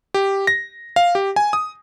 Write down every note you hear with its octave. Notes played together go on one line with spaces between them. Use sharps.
G4
A#6
F5
G4
G#5
D#6